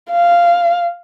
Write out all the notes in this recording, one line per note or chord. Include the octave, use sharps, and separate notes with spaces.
F5